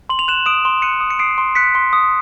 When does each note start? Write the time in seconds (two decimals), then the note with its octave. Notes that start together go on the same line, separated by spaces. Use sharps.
0.09 C6 F#7
0.19 F7
0.28 F#6 E7 F#7
0.46 D#6 D7 E7
0.65 C6
0.82 F#6 C#7 D#7
1.00 D#6
1.10 C#7
1.19 D#6 C7 D7
1.38 C6
1.55 F#6 B6 C#7
1.75 C6
1.93 D#6